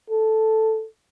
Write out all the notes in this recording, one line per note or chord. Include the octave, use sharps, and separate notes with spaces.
A4